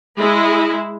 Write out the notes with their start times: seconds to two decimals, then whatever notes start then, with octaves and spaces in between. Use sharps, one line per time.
0.17 G#3 E4